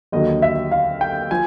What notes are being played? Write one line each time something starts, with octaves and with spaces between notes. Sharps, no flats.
D#2 D3 F#3 D#5
E5
F5
G5
F3 G#5